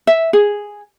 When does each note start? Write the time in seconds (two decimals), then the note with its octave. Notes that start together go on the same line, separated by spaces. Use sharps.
0.07 E5
0.33 G#4